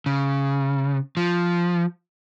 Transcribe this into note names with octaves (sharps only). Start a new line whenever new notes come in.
C#3
F3